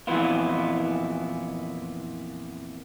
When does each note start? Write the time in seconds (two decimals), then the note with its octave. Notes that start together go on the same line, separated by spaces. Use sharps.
0.07 F2 A#2 E3 B3 E4 F4